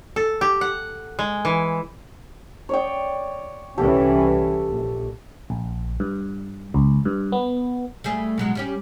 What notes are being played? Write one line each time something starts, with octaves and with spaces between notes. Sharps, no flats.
A4
G4
F#5
G#3
E3
C#5 D5 G5
C2 E3 C#4 G4 A4
A#1
A#1
G2
C#2
G2
B3
G3 A3 G#4
B2 F#3 G#3
G3 C#4 G4